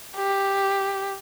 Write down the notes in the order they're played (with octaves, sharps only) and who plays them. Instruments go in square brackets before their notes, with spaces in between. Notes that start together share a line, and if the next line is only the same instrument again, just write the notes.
[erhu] G4